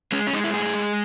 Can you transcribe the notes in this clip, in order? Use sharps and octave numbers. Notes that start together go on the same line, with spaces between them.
G#3 C#4
C#4
G#3 D#4
E4
A2 G#4
G#3